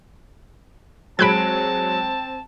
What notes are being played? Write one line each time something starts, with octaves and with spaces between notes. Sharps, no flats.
F#3 G#3 C4 A5 B5 F#6 G#6 D7